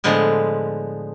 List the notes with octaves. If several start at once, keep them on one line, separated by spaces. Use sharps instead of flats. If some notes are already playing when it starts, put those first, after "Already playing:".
A2 D3 F3 G#3 B3